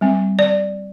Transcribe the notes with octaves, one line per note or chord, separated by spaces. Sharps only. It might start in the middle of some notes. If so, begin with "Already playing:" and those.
G3 C4
D5